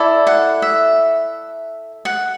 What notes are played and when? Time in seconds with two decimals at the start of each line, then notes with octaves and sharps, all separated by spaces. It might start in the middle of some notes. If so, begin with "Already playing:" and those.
Already playing: E4 A4 D5
0.27 F#5
0.62 E5
2.05 F#5